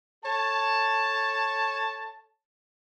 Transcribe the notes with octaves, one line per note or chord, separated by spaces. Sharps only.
A4 C#5 A5